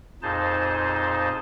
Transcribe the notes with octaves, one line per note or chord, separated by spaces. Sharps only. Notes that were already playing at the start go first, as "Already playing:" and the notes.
F2 A#2 D#4 G#4 C5 A5